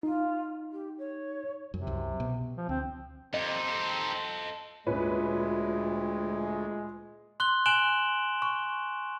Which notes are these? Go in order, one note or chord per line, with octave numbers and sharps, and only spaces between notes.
D#4 F4
G4
C#5
F#2 C3
C2 F#2
B2
F3
D2 C4
F2 C4 D#4 G4 D#5
A4 C5
D2 A#2 G#3 C#4 B4
C6 F#6 G7
G#5 F#6 D7 E7 F#7 G7
C#6